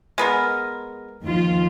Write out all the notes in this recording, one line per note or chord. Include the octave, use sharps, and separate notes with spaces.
G#3 B3 A#4
D#2 F3 F4